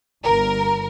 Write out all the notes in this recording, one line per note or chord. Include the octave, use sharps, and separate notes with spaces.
G1 A#4